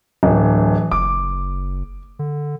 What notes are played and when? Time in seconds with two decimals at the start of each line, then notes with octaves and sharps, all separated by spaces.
0.23 D1 E3
0.92 F#1 D6
2.19 D3